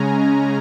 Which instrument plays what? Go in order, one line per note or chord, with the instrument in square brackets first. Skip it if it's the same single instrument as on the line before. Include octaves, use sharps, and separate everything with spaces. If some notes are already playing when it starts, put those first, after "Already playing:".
Already playing: [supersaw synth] C#3 G#3 C#4 G#5 A#5